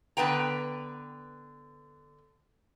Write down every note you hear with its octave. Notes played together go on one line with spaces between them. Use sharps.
D3 B3 B4 G5 A#5